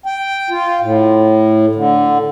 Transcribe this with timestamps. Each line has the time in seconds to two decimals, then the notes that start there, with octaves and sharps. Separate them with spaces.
0.06 G5
0.50 F4
0.81 A2
1.75 D3